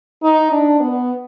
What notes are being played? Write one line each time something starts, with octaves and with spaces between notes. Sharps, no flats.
D#4
D4
B3